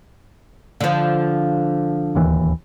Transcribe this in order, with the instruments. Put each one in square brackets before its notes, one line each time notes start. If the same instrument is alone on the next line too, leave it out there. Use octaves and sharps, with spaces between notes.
[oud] D3 F3
[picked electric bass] D1 D#2 E3